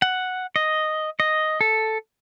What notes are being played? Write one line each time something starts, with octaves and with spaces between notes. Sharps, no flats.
F#5
D#5
D#5
A4